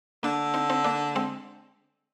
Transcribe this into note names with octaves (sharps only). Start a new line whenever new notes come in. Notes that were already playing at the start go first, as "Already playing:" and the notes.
D3 A#3 D4
C4 D#4
C4 D#4
A#3 D4
G#3 C4